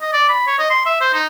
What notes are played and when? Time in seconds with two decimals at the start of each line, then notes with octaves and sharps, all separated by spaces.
0.02 D#5
0.13 D5
0.29 B5
0.47 C#5
0.59 D#5
0.70 C6
0.86 E5
1.01 C5
1.14 D#4